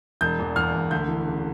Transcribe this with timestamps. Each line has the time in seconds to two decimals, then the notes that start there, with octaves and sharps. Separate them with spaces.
0.21 E1 G6
0.39 E2
0.56 E2 F6
0.74 E1
0.91 D2 G6
1.08 E3
1.27 C#3